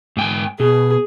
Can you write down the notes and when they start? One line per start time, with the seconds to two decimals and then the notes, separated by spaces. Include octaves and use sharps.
0.17 G#2 G5 G#5
0.60 B2 G#4